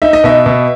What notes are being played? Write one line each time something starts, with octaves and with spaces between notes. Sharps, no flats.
D#4 E5
D#5
B2 E5
B2